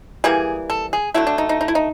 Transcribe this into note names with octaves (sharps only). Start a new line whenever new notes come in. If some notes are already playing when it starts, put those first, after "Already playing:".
E3 G3 A#3 G#4
A4
G#4
D3 F#3 A3 E4
D4
D#4
D#4
D#4
E4
D#4